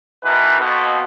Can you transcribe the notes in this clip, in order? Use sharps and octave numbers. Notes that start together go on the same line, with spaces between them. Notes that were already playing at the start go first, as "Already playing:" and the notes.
B2 D#3 E3 D#4 B4
F2 B2